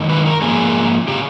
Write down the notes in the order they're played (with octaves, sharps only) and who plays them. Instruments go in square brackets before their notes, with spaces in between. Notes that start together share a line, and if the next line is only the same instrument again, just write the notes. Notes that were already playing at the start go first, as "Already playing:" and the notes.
Already playing: [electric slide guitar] F#2 D#3 G#3
B4
A#4
G#2 F3 A#3 C#4 G#4
C#3 G4